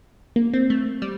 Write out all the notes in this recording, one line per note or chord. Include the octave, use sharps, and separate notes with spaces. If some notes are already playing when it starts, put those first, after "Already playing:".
A#3
C4
A3
G3